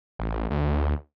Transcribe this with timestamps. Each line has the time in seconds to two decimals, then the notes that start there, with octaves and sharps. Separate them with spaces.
0.19 A1
0.51 D2